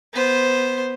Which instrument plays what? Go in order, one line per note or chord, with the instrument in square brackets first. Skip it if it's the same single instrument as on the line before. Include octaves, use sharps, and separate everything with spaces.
[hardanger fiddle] B3 C5